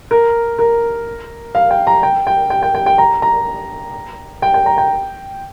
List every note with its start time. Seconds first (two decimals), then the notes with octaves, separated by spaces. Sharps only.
0.11 A#4
0.59 A#4
1.55 F5
1.70 G5
1.87 A#5
2.03 G5
2.27 G5
2.50 G5
2.63 G5
2.75 G5
2.86 G5
2.98 A#5
3.22 A#5
4.42 G5
4.54 G5
4.66 A#5
4.78 G5